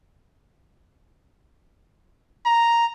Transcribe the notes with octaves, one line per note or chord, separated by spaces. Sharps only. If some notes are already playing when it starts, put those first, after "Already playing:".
A#5